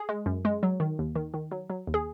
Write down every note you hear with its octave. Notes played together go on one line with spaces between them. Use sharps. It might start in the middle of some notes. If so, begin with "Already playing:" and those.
Already playing: G#4
G#3
F#2
G#3
F#3
D#3
D#2
D#3
D#3
F#3
F#3
D#2
G#4